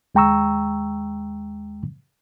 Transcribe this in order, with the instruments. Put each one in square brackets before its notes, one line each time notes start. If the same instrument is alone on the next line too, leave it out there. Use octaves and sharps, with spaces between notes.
[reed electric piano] D#2 G#3 G5 A#5 C#6 E6